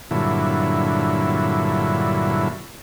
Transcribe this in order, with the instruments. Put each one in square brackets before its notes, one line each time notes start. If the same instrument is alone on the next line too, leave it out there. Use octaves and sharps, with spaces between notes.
[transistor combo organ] G2 A#2 D3 F#3 E4